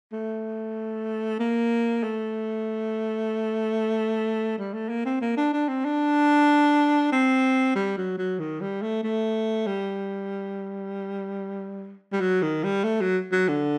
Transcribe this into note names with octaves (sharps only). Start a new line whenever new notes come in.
A3
A#3
A3
G3
A3
A#3
C4
A#3
D4
D4
C4
D4
C4
G3
F#3
F#3
D#3
G3
A3
A3
G3
G3
F#3
D#3
G3
A3
F#3
F#3
D3